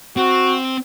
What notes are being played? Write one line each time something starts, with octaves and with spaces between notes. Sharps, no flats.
C4 F#4